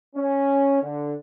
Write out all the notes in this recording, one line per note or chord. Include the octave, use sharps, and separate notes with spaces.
C#4
D3